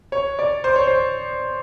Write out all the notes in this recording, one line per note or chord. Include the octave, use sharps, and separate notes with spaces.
C#5
D5
C5
C#5
C5